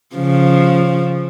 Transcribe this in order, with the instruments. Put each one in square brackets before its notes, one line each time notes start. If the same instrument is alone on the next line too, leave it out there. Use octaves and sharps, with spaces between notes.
[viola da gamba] C#3 F3